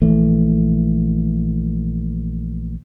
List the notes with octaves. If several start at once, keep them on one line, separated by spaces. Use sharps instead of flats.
A#1 E3 A3